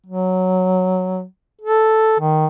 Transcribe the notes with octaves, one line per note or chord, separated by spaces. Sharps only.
F#3
A4
D#3